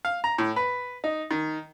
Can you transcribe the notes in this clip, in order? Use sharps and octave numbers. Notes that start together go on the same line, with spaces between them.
F5
A#5
A2
B4
D#4
D#3